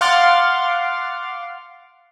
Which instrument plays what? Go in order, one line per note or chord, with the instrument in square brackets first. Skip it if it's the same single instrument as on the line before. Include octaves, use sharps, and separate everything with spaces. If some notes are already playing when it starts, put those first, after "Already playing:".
[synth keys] F5 F#5 C6 D6 F6 A6